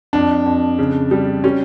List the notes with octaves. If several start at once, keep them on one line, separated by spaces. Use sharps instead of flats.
F2 D4
F2
C#3
G3
G3 C#4